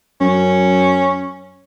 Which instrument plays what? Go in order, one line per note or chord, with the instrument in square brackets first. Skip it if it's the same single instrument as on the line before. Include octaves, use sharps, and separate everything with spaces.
[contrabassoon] F#2 [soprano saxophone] C#4